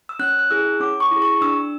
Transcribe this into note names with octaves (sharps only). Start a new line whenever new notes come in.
E6
C#4 F#6
F#6
E4 G#4 E6
C#4 D6
C#6
E4 G#4
C#6
D4 E6